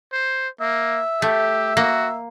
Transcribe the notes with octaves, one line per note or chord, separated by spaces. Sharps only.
C5
A#3 E5
A3 G4
A#3 F#4